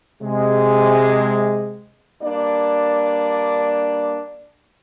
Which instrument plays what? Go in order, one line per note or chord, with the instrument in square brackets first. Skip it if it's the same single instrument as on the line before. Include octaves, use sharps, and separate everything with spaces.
[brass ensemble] C3 G#3
[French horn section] G2 A#3 D4 D5